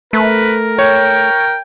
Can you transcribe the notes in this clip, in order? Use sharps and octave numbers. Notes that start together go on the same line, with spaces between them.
A3 A#4 B4
C#5 G5